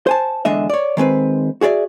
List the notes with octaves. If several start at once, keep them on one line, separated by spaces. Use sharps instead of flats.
C5 G#5 A5
E2 D3 G#3 D#5 E5
C#5 D5
D#3 G#3 C4 B4
F#4 G#4 C#5 D5 E5